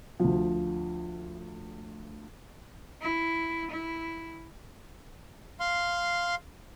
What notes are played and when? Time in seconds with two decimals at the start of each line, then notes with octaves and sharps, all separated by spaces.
0.20 D2 F3
3.02 E4
3.71 E4
5.60 F5 C6